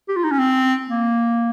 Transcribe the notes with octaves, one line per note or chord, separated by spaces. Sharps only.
G4
F4
D#4
C#4
C4
A#3